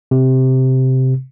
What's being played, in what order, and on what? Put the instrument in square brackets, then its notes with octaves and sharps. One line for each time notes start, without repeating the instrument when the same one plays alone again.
[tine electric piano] C3